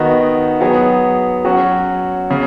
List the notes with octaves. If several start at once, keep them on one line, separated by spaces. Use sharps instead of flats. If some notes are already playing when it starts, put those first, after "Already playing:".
Already playing: D#3 B3 D#4 F#4
F#3 B3 G#4
F#3 C#4 F#4
C#3